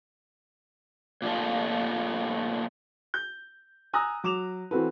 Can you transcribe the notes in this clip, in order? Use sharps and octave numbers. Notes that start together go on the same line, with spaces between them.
A#2 F3 A3
G6
G#5 A#5 D#6 E6 F#6 A#6
F#3 D6 E7 F7
E3 C4 F#4 A4 B4